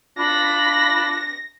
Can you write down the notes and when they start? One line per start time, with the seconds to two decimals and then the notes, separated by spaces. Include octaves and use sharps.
0.18 D4 F4 B5 A#6